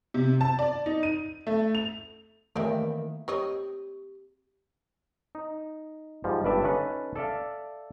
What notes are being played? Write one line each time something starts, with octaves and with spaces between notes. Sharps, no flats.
C3
A5
D5
D#4
D#7
A3
F7
D#3 E3 A3 A#3 C4 G4 D5 E5
C4 G4 C#5 D#5
D#4
G#2 F3 G3
G1 G2 B4 D5 E5
C#4 D#4 A4 B4
A4 D5 E5 F5